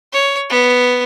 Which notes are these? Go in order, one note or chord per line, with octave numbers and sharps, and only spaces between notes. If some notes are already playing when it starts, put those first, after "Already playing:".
C#5
B3